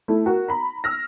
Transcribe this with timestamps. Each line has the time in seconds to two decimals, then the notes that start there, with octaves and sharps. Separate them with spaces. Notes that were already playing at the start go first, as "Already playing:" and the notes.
0.08 A3 E4
0.26 F#4 A#4
0.48 A#5 B5
0.84 E6 F6 A#6